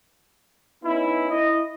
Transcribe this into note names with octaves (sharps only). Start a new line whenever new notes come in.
B3 C#4 D#4 E4
E4 D#5